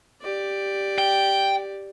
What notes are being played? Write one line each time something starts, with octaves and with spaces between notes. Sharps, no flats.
G4 D5
G5